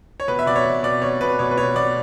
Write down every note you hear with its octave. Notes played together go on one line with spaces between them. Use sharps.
C#5
B2 B4
E5
B2 D5
C#5
B2
B2 D5
B2 C#5
B2 B4
B2 C#5
B4
B2 C#5
B2 D5